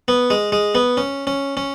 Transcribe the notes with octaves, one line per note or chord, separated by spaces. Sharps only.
B3
G#3
G#3
B3
C#4
C#4
C#4